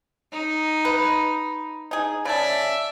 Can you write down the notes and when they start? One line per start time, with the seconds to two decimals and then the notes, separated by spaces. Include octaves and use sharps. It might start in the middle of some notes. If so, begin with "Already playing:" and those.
0.33 D#4
0.85 B4
1.91 D#4 G#4
2.25 C#3 D5 E5 A5